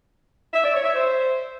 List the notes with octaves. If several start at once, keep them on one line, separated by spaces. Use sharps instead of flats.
E5
D5
C#5
E5
C5